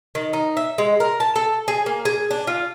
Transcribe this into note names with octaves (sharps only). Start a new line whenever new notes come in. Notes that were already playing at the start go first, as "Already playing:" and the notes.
D#3
D#4
E5
G#3
A#4
A5
A4
G#4
A#3
G#4
D4
F4